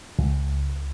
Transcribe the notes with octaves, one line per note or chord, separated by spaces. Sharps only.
C#2